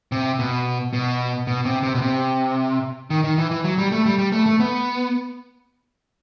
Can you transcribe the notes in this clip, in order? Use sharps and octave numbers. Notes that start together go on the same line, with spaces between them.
C3
B2
B2
B2
C3
C3
B2
C3
D#3
D#3
E3
E3
F#3
G3
A3
G3
G3
A3
A3
B3